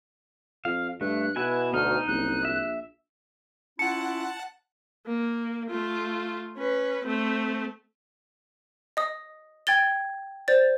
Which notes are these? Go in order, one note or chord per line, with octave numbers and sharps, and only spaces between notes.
F2 F5
G2 A3 F#6
B2 B3 E4 G#5
D2 D#4 F6
F#1 C2 F#6
A#1 E5
C#4 E4 F4 F#5 A5 C#7
A#3
A3 F4
C#4 B4
A3 C4
D#5 D#6
G5 G#6 A6 G7
C5 D5 A6